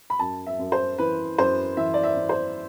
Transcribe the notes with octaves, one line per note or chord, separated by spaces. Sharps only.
B5
F#2 A5
E5
F#2
C5
E3 B4
F#2 C5
E3 E5
D5
E5
E3
C5